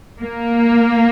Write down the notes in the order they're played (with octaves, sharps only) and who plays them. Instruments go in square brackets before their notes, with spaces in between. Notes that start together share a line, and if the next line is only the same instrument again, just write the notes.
[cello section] A#3